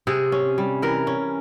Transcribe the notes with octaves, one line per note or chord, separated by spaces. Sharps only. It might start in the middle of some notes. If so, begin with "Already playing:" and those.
C3 G#4
C#4
G3
E3 A#4
C#4